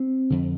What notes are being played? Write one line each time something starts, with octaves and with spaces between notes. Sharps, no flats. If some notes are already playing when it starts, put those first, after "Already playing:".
Already playing: C4
F2 D3